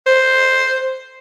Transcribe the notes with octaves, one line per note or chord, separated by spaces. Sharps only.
C5